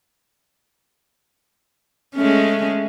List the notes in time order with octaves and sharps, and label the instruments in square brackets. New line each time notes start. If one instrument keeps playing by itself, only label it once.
[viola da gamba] G#3 A3 C#4